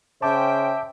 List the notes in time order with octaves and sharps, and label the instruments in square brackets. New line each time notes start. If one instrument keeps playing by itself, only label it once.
[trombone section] C#3 C#4 C5 [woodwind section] E5 G5 [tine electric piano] A5 D6